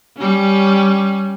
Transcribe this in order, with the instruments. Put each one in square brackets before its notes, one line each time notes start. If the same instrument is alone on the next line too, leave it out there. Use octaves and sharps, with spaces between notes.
[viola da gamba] G3 C#4